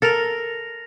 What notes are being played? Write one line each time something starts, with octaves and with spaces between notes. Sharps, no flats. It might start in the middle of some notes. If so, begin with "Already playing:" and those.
A4 A#4 A6 A#6 F7